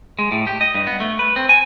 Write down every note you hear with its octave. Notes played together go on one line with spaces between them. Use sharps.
G#3
A2
G4
D#5
G2
B3
A3
B4
C4
G#5